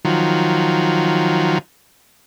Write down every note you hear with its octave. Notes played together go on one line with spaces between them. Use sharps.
D#3 F3 F#3